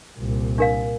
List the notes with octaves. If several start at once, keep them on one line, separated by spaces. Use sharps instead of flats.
C2 A#2
D4 A#4 F5